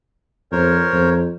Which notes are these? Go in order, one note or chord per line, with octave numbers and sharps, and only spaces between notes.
F2 A#4 C5 C#5
F2